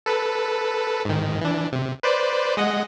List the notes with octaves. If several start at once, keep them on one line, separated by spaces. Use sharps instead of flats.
A4 B4
G#2 D#3
E3 D4
C3
B4 C5 D5
G#3 D#5 F#5